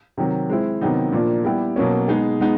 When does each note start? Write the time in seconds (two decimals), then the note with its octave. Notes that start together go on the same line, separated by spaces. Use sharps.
0.17 C3 D#3 F#3
0.49 G#3 C4 E4
0.81 C3 D#3 F#3 B3 D#4
1.12 A#2 F3 A#3 D4
1.44 G3 B3 E4 G4
1.76 B2 F#3 A#3 C#4
2.08 G#3 B3 D#4 G#4
2.40 G#3 B3 D#4